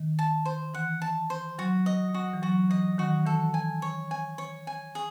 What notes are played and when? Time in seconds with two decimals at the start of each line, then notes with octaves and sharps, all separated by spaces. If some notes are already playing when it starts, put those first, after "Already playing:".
Already playing: D#3
0.19 A5
0.45 C5
0.74 E3 F#5
1.02 A5
1.30 C5
1.59 F#3 F#4
1.86 D#5
2.14 F#4
2.33 E3
2.42 F#3 F#4
2.70 E3 D#5
2.98 D#3 F#4
3.26 E3 A4
3.54 G#5
3.82 C#5
4.11 G#5
4.38 C#5
4.67 G#5
4.95 G#4